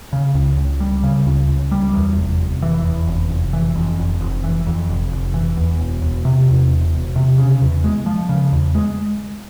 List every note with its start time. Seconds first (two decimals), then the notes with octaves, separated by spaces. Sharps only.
0.13 C#3
0.34 C#2
0.57 C#2
0.80 G3
1.03 C#3
1.26 C#2
1.48 C#2
1.71 G3
1.94 E2
2.17 F1
2.39 F1
2.62 E3
2.85 E2
3.07 F1
3.30 F1
3.53 E3
3.76 F2
3.98 F1
4.21 F1
4.44 E3
4.67 F2
4.89 F1
5.12 F1
5.34 E3
5.57 E2
5.79 E1
6.02 E1
6.25 C3
6.48 E2
6.71 E1
6.93 E1
7.16 C3
7.38 C#3
7.61 E2
7.84 G#3
8.06 F3
8.29 C#3
8.52 E2
8.75 G#3